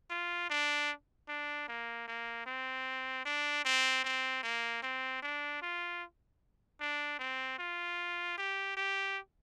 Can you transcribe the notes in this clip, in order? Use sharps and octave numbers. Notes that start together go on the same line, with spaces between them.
F4
D4
D4
A#3
A#3
C4
D4
C4
C4
A#3
C4
D4
F4
D4
C4
F4
G4
G4